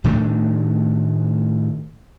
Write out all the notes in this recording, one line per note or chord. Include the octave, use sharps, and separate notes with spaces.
A2 D#3 A3 D4